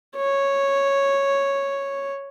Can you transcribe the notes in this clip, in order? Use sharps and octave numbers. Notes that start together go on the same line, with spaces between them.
C#5